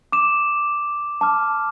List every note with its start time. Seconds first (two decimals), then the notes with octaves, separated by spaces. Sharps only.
0.12 D6 E7
1.21 A5 D6 F6